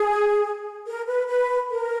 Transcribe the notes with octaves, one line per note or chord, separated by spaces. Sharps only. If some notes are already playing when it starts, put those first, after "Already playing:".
Already playing: G#4
A#4
B4
B4
A#4